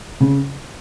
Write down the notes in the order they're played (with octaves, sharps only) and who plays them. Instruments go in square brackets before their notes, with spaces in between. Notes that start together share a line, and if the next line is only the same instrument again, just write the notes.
[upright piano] C#3